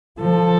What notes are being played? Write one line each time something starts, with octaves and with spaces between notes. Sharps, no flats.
F3 A4